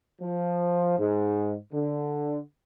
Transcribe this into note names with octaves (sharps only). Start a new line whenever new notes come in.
F3
G#2
D3